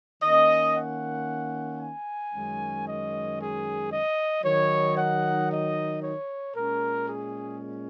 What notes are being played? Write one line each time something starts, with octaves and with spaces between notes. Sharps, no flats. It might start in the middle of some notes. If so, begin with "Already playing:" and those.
D#3 A#3 C#4 D#5
F#5
G#5
F#2 D#3 G#3 C#4
D#5
G#4
D#5
D#3 F#3 D#4 C#5
F#5
D#5
C#5
A#2 G#3 C#4 A#4
G#4